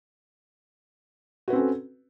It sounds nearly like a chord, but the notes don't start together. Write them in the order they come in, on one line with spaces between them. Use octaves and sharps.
F#4 B4 C4 C#4 A4